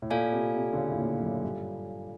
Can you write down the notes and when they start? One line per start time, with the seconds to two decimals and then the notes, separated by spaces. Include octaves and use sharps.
0.02 A2
0.10 A#2 F4 A4 D5 F5 G#5
0.33 C3
0.55 C3
0.73 D3
0.77 C#3
0.91 A2
0.99 A#2
1.21 F#2
1.43 G2